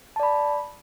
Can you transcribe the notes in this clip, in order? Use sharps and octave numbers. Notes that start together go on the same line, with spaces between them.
D5 A5 B5